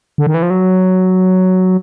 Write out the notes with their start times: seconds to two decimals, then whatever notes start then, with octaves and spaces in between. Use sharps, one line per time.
0.18 D3
0.27 D#3
0.34 E3
0.43 F3
0.50 F#3